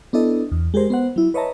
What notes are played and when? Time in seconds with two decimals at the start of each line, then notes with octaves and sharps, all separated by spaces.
0.13 B3 D4 E4 A4 D#5
0.52 E2
0.74 G#3 G4 G#4 A#4 C5
0.90 B3 C5 F#5
1.16 F#3 E4
1.34 B4 C#5 D#5 E5 A5 A#5